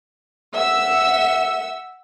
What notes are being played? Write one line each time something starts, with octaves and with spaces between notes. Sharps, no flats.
E5 F#5 E6